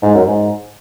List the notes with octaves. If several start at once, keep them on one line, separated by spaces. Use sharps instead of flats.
G#2
F#2
G#2